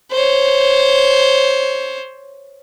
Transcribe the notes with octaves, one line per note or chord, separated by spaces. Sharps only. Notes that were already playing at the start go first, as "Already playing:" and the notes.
C5 C#5